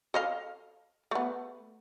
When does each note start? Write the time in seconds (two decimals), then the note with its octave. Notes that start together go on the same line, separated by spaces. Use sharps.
0.14 A4 D#5 F5
1.11 A3 B3